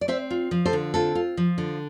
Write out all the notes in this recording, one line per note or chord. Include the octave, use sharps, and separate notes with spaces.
D5
C4 C5 E5
F4
F3
A4 C5
D3
C4 F4 A4
F4
F3
D3